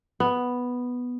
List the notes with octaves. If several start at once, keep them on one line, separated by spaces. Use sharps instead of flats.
B3